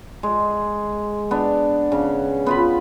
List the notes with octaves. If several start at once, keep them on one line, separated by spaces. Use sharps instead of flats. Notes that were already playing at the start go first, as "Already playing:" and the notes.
G#3
B3 D4
C#3
B3 F4 B5